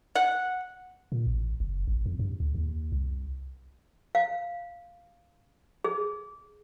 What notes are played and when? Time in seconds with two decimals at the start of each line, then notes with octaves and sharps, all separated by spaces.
0.15 F#5
1.12 A#2
1.27 A1
1.60 F#1
1.87 A1
2.06 F2
2.19 G2
2.40 D2
2.55 D#2
2.92 C2
4.15 F5
5.84 G#4